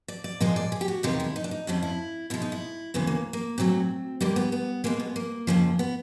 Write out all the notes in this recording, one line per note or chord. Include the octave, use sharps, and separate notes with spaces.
D5
D5
A#2 F3 G#3 D#5
D5
G#4
G4
F#4
E2 C3 D#3 G#3 F4
E4
D#4
D4
D#4
F2 C#3 F3 E4
E4
B2 G#3 E4
D#4
E4
D2 C#3 E3 B3
A#3
A#3
A#2 F#3 A3 C4
D#2 D3 G3 A#3
B3
B3
B2 G#3 A#3
B3
A#3
F2 C#3 F3
B3